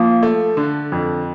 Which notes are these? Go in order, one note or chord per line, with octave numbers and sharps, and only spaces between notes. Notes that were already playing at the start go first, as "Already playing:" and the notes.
Already playing: F3 A#3
A3
D3
F2